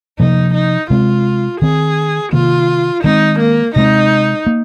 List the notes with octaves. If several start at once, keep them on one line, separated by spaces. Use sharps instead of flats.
C3 F3 A#3 D#4
D#4
C3 G#3 C4 F4
D#3 C4 G#4
C3 D#3 A#3 F4
D#3 G#3 C4 D#4
A#3
C3 G#3 C4 D#4
A#3